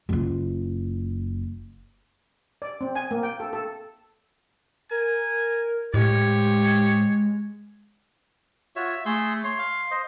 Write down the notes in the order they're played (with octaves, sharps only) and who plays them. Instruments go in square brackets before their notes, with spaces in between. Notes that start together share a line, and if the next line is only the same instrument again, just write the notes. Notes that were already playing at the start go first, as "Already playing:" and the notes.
[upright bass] F#1 F4
[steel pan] D5
C4
G#5
A#3
G5
A4
A4
[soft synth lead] A#4 [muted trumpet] G#5
[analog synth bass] A2 [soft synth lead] G#3 [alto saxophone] G4 [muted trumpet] C#5
[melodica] F4 F#4 C#5 [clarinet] E5
[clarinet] A3 [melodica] G#4 C6 E6
[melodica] C#5 [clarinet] C6
[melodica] F5
C5 D#5